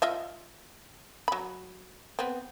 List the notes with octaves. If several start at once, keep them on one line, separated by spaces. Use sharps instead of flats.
F4 D#5 E5
F#3 B5
B3 C4